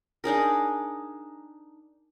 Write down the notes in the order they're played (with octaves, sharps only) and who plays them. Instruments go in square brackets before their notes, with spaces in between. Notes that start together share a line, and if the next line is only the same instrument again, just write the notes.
[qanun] D4 D#4 G#4 A#4